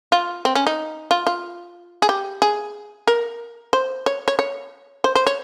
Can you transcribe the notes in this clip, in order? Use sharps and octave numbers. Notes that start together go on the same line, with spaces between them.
F4
C4
C#4
D#4
F4
F4
G#4
G4
G#4
A#4
C5
C#5
C#5
C#5
C5
C5
C#5